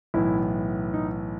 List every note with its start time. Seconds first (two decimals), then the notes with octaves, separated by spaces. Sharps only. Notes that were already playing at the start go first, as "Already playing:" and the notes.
0.14 B1 A2 E3 B3 E4
0.94 D#4